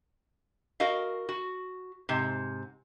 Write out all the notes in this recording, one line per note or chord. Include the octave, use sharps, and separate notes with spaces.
F#4 A#4 D#5 F5
F#4
G#2 C3